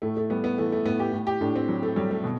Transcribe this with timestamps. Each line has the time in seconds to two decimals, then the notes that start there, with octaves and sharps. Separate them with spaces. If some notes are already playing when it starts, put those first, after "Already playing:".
0.02 A2 A3
0.17 A3
0.30 G3 B3
0.44 B3
0.58 E3 A3
0.72 A3
0.85 A2 B3
1.00 G4
1.13 A2
1.27 G4
1.41 A2 D4
1.56 C4
1.69 F#3
1.83 A3
1.96 F#3 G3
2.11 A3
2.24 B2